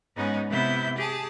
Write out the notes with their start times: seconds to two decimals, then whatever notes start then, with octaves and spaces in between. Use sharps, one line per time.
0.16 G#2 G#3 B3 C#4 D#4
0.49 C3 B3 E4 E5 G6
0.97 G4 G#4 A5